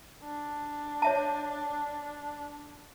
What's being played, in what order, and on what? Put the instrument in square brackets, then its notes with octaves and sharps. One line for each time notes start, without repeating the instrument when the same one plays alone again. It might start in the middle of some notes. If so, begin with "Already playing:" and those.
[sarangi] D4
[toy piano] C#5 E5 A5